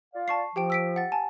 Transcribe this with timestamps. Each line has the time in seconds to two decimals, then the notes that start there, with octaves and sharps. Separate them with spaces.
0.14 F4 D5 F5
0.28 A5 C#6 C7
0.56 F3 G4 G5 D7
0.70 E6 B6 D7
0.96 F#5 A6
1.12 G#5 A5